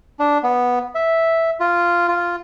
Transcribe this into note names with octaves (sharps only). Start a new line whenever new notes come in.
D4
B3
E5
F4
F4